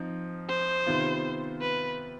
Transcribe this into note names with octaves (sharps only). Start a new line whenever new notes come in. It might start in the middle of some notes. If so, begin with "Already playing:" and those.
Already playing: F3 C4 D#4
C5
C3 D#3 B3 F4
B4